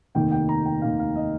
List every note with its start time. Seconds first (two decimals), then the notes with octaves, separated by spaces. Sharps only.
0.15 F1 D#2 D#3 A#3 D#4 G5
0.32 G5
0.49 A#5
0.66 G5
0.82 F1 D#2 D#3 A#3 D#4 F5
0.99 F5
1.16 D#5